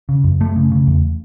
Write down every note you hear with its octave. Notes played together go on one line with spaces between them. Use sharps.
C#3
F#2
F#2 A3
C#3
C#3
E2